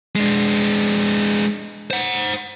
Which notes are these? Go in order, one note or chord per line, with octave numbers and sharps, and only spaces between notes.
G#3 D4
C5 F#5